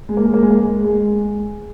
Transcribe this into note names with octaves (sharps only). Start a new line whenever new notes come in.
G#3
A#3
G#3
A#3
G#3
A#3
G#3
G#3